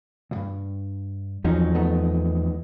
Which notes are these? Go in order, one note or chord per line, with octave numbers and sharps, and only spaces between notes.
C#2 G2
E2 F3 F#3 C#4 D#4
A3 B3 D#4